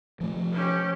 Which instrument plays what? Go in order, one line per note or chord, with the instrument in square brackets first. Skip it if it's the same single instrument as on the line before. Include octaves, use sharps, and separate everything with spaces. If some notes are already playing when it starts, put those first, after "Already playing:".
[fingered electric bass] F3 A3
[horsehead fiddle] C#4 G4